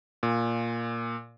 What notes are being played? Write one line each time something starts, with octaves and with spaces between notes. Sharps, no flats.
A#2